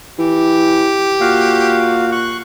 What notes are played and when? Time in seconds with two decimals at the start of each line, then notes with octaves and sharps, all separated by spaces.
0.19 E3 G4
1.21 A#2 F#4 F5
2.12 C#6 F#6